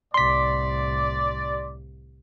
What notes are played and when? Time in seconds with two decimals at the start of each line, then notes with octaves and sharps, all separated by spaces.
0.14 C2 A2 D5 C6 B6